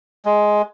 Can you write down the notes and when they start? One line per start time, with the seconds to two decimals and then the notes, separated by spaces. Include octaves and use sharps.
0.25 G#3